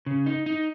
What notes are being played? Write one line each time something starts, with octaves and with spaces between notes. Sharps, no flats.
C#3
D#4
D#4